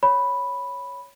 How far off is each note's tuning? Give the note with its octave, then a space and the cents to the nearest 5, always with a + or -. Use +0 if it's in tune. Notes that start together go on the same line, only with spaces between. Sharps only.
C#5 +0 B5 +0